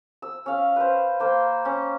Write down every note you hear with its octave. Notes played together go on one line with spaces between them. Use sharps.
E6
C#4 F5
B4 C5
A#3 C5 G5
C#4